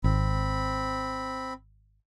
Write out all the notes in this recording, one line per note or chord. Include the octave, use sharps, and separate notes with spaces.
G#1 C4 B5